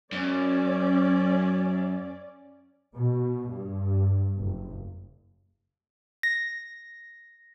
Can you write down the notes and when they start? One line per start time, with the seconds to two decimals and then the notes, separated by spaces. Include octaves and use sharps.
0.13 F#2 C#4 D5
2.95 B2
3.49 G2
4.38 F#1
6.23 A#6